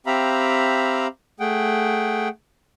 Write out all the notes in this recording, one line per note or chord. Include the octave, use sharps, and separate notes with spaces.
C4 G4 E5 F5 A#5 B5
A3 G#4 F#5 G5